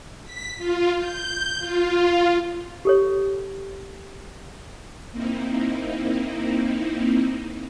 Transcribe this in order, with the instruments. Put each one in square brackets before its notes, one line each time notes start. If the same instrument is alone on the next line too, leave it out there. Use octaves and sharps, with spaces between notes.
[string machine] B6
F4
G6
F4
[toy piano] G4 A4 C#5
[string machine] A#3 C4 D#4 E4